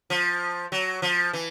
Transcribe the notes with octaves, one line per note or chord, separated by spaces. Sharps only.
F3
F#3
F3
E3